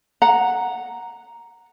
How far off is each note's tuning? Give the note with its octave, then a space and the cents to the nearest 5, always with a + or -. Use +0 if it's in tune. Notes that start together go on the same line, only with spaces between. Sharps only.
F#5 -5 A#5 +0